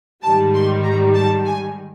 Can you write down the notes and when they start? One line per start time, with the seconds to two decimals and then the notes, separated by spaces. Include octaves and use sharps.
0.23 G#2 D#3 G3 A5
0.54 C6
0.83 A#5
1.14 A5
1.45 G#5